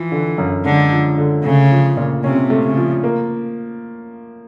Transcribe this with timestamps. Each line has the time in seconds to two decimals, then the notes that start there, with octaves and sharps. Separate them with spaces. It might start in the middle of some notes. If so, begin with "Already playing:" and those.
Already playing: E3 F3
0.12 D3
0.38 F#2
0.64 D3 G#3
0.92 F3
1.18 D3
1.44 C#3 A3
1.72 F3
1.97 A#2
2.24 C3 C#4
2.50 A3
2.64 C#3
2.77 F3
3.04 A#3